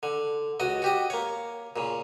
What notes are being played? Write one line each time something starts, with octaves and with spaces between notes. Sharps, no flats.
D3
C#2 F#4 D#5
F#4 G4 D#5
A#3 C#5
A#2 C#3